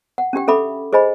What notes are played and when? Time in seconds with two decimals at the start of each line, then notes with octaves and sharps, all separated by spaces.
0.18 F#5
0.33 C#4 D4 G4 G5
0.48 C#4 A4 E5 B5 D6
0.93 G#4 C5 D#5 G#5 B5